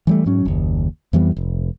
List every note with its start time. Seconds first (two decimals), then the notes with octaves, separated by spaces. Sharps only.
0.07 E3 G3 A3
0.26 G#2 F#3 C#4
0.45 F#1 D#2
1.13 F2 E3 G3 B3
1.37 F1